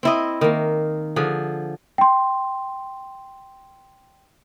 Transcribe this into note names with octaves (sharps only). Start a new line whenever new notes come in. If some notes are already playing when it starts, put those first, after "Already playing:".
C4 E4 D#5
D#3 A#3
D3 F3 G#4
G5 C6